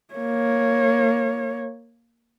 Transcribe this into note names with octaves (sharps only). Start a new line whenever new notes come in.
A#3 C#5